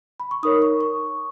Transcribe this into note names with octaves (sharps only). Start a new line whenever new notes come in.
B5
C#6
D#4 A#4 C#5 D#6
C#6
C#6